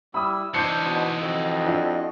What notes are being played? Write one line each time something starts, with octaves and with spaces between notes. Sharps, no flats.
G3 E4 B5 D#6 E6
E3 D4 D#4 C5 G6 C7 C#7
B2
F2 F#4 D#5
D4 E4 F4